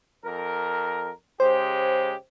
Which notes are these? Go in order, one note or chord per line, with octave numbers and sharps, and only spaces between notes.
F2 A#4
C#3 G#3 G4 C5